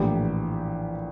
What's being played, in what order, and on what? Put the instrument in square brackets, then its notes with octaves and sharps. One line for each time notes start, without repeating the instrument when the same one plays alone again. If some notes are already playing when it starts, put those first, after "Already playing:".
Already playing: [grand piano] A#1 A2 E3 G4